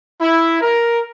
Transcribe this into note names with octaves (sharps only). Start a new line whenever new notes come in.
E4
A#4